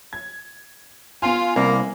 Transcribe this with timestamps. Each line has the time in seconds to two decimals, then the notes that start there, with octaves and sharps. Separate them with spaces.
0.13 G#6
1.22 B3 F4 G#5
1.56 C2 A#3